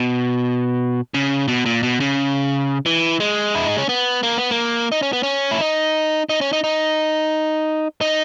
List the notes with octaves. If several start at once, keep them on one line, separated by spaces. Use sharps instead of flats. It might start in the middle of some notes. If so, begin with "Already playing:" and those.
Already playing: B2
C#3
B2
A#2
B2
C#3
E3
G#3
E4
D#4
C#4
B3
A#3
B3
A#3
D#4
C#4
B3
C#4
E4
D#4
D#4
C#4
D#4
D#4
D#4